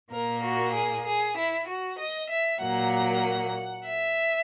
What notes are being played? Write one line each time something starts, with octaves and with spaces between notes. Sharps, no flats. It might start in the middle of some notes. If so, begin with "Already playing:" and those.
A#2 A#3 A#4
F#4
G#4
G#4
E4
F#4
D#5
E5
A#2 F#3 A#3 F#5
E5